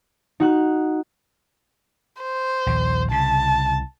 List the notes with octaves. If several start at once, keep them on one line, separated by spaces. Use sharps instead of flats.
D#4 F#4 F#6
C5
A#1 D#2
C2 C#3 A5